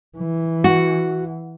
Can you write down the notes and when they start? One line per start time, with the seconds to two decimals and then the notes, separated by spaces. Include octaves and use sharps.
0.18 E3
0.64 F#4